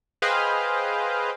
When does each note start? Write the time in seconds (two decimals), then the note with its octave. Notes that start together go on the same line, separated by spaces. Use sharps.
0.22 G#4 B4 C5 D#5 F5 G5